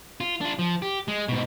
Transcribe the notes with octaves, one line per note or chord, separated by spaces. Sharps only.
F4
D4 F4
F3
G4
G#3
G#2 B2